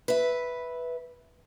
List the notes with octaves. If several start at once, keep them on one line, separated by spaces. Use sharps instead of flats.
B4 E5